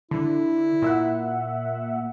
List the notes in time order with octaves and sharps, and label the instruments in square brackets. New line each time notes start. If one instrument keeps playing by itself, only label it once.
[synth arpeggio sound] D3 [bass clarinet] E4
[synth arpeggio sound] A#2 E5 F#5